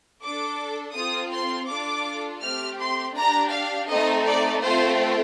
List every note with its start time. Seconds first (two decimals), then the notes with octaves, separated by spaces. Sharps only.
0.21 D4 A4 D6
0.95 C4 F4 A4 D#6
1.32 C6
1.68 D4 F4 A4 D6
2.42 A3 C4 G4 F6
2.79 C6
3.15 D4 G4 A#5
3.52 F5
3.89 A3 C4 D#4 A4 D#5
4.25 D5
4.62 A3 C4 F4 A4 C5